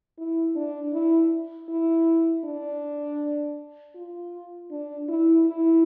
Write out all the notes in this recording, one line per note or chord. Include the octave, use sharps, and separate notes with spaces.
E4
D4
E4
E4
D4
F4
D4
E4
E4